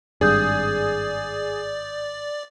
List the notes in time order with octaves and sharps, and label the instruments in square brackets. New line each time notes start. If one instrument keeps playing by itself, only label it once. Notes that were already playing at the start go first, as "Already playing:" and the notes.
[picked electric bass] G#1 G2 [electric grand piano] G#4 [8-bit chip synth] D5 [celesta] D#6 G6